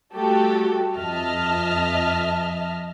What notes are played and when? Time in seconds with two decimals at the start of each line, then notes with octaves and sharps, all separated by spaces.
0.13 G3 A3 F#4 G4 A4
0.96 F2 D#5 E5 A5 F6